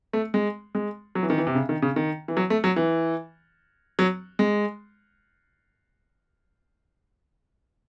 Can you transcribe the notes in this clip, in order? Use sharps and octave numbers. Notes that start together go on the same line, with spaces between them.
A3
G#3
G#3
F#3
E3
D#3
E3
C3
C#3
D#3
C#3
D#3
E3
F#3
A3
F#3
E3
F#3
G#3